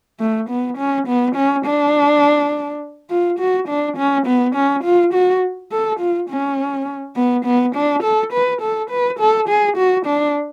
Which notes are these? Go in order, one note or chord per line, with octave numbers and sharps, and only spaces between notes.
A3
B3
C#4
B3
C#4
D4
F4
F#4
D4
C#4
B3
C#4
F4
F#4
A4
F4
C#4
B3
B3
D4
A4
B4
A4
B4
A4
G#4
F#4
D4